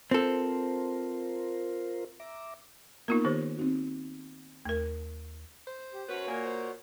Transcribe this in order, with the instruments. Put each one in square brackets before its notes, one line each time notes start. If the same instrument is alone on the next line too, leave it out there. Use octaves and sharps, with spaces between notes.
[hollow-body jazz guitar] C4 A4 [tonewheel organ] F4 A#4 C5
[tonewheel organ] E5 A#5 D6
[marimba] A#3 B3 [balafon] D#4 F4 A#4
[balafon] D#3 G4 C5
[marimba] C4 D#4 F#4
[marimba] D#2 [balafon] A3 A#4
[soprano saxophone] C5
[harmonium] G4
[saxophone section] F#2 C#4 B4 [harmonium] F#4 C#5
[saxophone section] A#2 A#3 [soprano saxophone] G#5
[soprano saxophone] C5